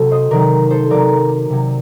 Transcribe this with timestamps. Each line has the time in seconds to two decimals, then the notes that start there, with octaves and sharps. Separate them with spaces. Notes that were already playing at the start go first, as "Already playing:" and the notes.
Already playing: C3 F#3 F#4 A4
0.11 C5 D#5
0.31 C3 D#3 F#3 A#4 D5
0.70 A4 C5
0.90 C3 F#3 A#4 D5
1.50 C3 F#3